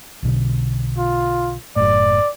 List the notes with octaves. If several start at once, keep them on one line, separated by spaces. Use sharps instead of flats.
B1 B2 D3
F4
F#1 A2 D5